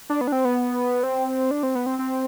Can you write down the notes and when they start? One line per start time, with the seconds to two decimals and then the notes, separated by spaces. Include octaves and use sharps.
0.10 D4
0.21 B3
0.27 D4
0.32 C4
0.45 B3
1.03 C4
1.51 D4
1.63 C4
1.75 B3
1.86 C4
1.99 C4